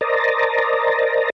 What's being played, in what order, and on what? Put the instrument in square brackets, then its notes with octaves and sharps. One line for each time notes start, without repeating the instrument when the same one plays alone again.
[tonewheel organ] A#4 C5 D5 D#5 A5 A#5